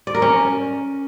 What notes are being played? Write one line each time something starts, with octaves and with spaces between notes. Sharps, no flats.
D5
A#4
C#4